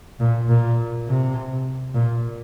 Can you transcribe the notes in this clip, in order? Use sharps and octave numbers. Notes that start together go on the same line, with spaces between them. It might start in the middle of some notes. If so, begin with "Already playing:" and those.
A#2
A#2
C3
A#2